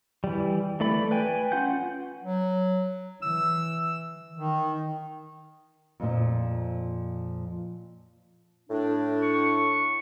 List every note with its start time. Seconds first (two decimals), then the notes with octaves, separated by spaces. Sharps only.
0.24 E3 G3
0.80 E3 A3 D5 B5
1.11 B4 G5 G#5
1.52 C#4 F4 F#5 G6
2.23 F#3
3.22 E3 E6
4.37 D#3
6.00 F2 A#2 F3
8.70 A2 D4
9.22 C#6